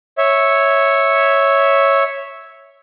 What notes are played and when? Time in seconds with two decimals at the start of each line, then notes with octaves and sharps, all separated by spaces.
0.18 C#5 E5